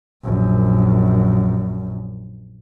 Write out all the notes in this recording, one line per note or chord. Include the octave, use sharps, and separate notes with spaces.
A#1 F#2